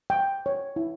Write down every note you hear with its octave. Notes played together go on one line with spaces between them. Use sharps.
G5
C#5
E4